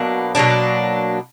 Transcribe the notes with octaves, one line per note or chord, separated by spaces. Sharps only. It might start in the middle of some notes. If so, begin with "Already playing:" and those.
Already playing: B2 F#3 A#3 D4
B2 F#3 A#3 D4